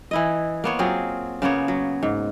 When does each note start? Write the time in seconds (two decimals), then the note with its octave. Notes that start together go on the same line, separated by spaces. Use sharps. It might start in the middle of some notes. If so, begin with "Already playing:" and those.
0.11 E3 E4 D#5
0.64 A#3 B3 C#5
0.79 F#3 C4 F4 G#4
1.42 C#3 A#3 B3 C#5
1.68 F#3
2.03 G#2